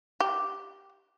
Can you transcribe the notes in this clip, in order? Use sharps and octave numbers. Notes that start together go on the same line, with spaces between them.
G4